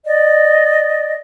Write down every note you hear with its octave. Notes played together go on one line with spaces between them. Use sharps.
D5 D#5